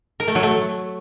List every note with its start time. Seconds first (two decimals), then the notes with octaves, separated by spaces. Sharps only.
0.20 A#4
0.27 A3
0.35 F#3
0.43 A3